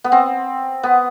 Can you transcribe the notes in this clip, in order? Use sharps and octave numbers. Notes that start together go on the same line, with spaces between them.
B3
C4
B3